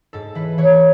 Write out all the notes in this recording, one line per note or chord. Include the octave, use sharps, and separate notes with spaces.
G#2 A4
E3 B4
E3 C#5